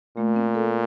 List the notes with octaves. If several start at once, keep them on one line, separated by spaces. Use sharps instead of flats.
A#2 A3
C4
A4